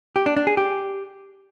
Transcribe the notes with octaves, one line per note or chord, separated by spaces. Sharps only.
G4
D4
D4
G#4
G4